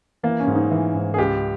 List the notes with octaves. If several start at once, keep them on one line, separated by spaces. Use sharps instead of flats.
E3 A#3
C#4
G#2
D#4
E3
G#2
G#4
C#2 G4